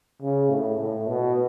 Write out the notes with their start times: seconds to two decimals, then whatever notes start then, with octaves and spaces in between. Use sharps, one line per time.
0.22 C#3
0.50 A2
0.79 A2
1.07 B2